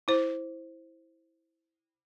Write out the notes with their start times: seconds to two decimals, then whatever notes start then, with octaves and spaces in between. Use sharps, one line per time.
0.08 E4 C5